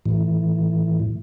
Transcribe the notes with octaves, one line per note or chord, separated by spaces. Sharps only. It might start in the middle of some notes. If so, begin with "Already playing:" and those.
A2 E3